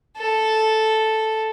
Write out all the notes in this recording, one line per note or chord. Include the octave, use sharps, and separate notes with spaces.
A4